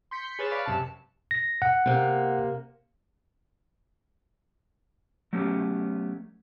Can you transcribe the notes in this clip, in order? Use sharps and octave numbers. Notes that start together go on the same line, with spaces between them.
C6 G6 B6 C#7
G#4 B4 C#5 F6 A6 E7
B4 C#5 D5 F5 B5
F#2 C3 A5
A#6
F#5
C3 A#3
F#3 A3 B3 C#4 G4